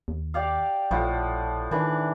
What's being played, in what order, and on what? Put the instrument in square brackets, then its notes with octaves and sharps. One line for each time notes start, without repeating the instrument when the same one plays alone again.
[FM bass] D#2
[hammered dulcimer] G4 D5 F5
[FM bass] A#1 [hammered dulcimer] A2 F3 F#5
[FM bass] D#3 [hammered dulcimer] E3 D4